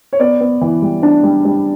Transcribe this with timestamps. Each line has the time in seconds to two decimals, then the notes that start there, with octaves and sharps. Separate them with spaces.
0.13 C#5
0.20 B3 D5
0.41 B3
0.61 E3
0.82 G3
1.03 D4 A5
1.23 G3
1.45 G3